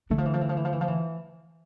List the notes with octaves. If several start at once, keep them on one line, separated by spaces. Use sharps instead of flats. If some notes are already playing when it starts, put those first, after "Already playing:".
D3 E3 A3 D4
F3
E3
F3
E3
F3
E3
F3
E3
F3
E3